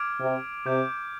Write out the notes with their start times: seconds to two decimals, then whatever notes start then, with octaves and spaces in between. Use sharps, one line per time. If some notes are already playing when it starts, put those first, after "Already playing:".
Already playing: D6 F6 G#6 D7 F7
0.21 C3
0.66 C3 D6 G6 D7